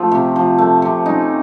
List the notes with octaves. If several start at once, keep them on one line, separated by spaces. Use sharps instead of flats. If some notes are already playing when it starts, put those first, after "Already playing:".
Already playing: F3 A3 F4
C3
F3
A3
C3
C#4 D#4